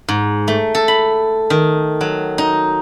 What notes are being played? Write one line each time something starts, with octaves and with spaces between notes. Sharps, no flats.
G#2
A3
A4
B5
D#3
F#3
D#4